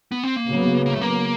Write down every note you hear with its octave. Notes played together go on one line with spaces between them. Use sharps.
B3
C4
A#3
C#3 F#3 B3
A#3
A3
A#3